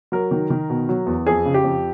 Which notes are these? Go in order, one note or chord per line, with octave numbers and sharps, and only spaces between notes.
F#3 A#4
D#3
D#3
B2
F#3
E2
F2 G#4
C#3
G4
F2